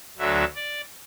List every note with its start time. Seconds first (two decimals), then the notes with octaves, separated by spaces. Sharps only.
0.18 D2 D3 F#3 E5
0.55 D5